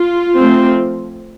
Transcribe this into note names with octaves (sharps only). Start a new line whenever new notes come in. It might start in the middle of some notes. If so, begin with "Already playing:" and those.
Already playing: F4
F3 A3 C4